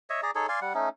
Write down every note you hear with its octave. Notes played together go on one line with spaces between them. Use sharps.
C#5 D#5 E5
G#4 D5 A#5
D#4 G#4 A4 C#5
D5 F5 G#5 C6
G3 F#5
A3 C#4 D#4